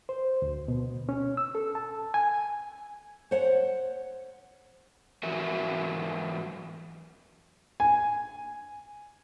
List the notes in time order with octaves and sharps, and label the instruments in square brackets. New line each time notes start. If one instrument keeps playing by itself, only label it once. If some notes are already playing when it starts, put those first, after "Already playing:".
[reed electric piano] C5
D2
B2
C#4
E6
A4
A5
G#5
[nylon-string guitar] C5 C#5 F#5
[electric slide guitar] G#2 E3 F#3 F#4 A#4 E5
[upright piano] G#5